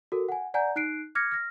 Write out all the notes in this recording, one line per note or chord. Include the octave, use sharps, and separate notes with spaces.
F#4 A4 A#4
F#5 G#5
D5 F#5 G#5 A#5 G6
D#4 F#6 C7 D7
D6 F6 G#6 A#6 C#7
F6 A#6